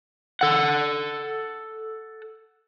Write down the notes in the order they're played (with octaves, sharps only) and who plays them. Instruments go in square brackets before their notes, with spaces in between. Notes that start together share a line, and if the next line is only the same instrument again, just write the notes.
[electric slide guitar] A4 F#5